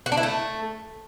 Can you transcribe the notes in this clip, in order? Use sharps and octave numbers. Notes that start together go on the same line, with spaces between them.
F#4
D4
E4
A3